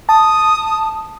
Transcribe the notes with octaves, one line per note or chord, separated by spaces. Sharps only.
A5 D#6